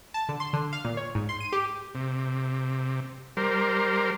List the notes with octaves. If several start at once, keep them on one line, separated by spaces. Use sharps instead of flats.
A5
D3
C6
D3
F5
A#2
C#5
G#2
C6
D#7
G4
C3
G3 A#4 C5